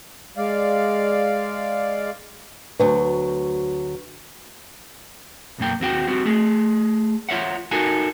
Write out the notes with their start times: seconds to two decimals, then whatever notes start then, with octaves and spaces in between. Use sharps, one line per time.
0.37 G#3 D5 F5
2.80 D2 F#3 B4
5.58 B1 F#2 A#3 G5
5.80 D#2 C4 F#4 G5
6.07 G3 C4 F#4
6.25 A3 G#4
7.29 F4 C#5 E5 F#5
7.71 D#4 F#4 A4 A#4 G#5